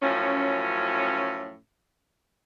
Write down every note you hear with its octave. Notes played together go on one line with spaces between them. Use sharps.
F#2 A2 F3 C#4